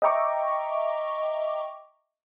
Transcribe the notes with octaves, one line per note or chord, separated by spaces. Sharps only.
D#5 E5 G5 A#5 C#6 D6